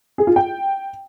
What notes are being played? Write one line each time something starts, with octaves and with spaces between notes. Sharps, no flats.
G#4
F4
G5